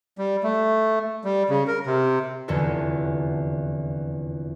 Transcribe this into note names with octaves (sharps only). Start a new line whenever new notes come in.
G3
A3
G3
C#3
A#4
C3
F1 E2 D3 C#4 F#4 A4